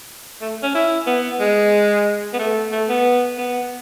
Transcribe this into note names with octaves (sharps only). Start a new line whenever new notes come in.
A3
C#4
E4
B3
G#3
B3
A3
A3
B3
B3